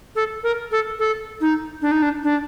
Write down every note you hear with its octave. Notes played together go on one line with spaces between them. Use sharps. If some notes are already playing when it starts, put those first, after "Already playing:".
A4
A#4
A4
A4
D#4
D4
D#4
D4
D4